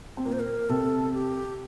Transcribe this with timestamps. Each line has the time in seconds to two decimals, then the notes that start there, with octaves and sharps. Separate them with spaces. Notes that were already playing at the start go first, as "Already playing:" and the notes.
0.17 C4
0.25 A#2 A#3 A#4
0.32 C5
0.39 A#4
0.69 C3 C4 A4
1.14 G4